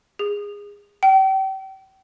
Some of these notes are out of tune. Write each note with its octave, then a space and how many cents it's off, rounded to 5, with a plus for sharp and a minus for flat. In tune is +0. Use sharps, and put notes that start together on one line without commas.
G#4 -25
G5 -35